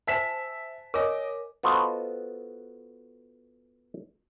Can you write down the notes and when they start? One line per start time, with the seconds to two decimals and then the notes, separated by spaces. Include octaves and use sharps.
0.07 C5 E5 G#5 A5 B6 E7
0.94 A#4 C#5 D#5 G#5 D6
1.63 B3 F4 F#4 A4 C5 D#5